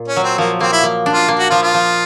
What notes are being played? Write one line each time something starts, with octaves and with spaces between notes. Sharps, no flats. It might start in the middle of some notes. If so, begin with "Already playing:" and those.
Already playing: A#2
C#4
F#3
C4
F3 A#3
A#3 C4
E4
A#3
D4
F4
A#3
F#4
F3 F4
F4
F3